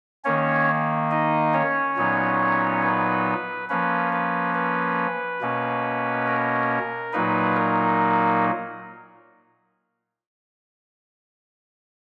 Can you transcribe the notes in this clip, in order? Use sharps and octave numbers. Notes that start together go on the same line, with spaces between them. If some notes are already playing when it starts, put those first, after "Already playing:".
D#3 A#3 C#4 C#5
D#4 D#5
C#4 C#5
A#2 F#3 B3 D#4
B4
F3 A#3 C#4 B4
B4
B4
B2 A#3 C#4
A#4
A#2 F#3 A#3 D#4 B4
A#4